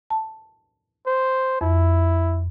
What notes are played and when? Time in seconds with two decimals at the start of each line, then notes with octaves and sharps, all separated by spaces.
0.10 A5
1.07 C5
1.61 F2 E4